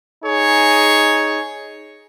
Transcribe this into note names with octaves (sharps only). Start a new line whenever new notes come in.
D#4 G#4 C#5